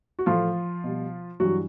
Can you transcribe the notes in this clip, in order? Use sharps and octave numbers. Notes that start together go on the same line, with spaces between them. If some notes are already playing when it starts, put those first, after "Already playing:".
F#4
A2 E3 F3 A3 F4
B2 G3
G2 E3 F#3 G3 F#4